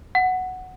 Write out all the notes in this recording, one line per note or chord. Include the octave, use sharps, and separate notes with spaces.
F#5